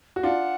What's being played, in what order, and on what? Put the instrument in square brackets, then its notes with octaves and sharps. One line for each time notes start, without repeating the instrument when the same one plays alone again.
[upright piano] F#4
[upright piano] D4 F4 [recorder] F#5